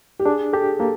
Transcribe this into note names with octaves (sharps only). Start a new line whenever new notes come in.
G4
D4 G#4
G4 A4
A#3 A4